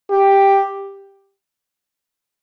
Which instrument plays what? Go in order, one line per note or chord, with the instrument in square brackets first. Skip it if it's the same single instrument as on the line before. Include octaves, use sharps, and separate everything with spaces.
[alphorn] G4